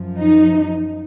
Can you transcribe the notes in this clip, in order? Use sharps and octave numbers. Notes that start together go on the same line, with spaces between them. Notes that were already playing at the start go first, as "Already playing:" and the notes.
Already playing: F#2 F3
D#4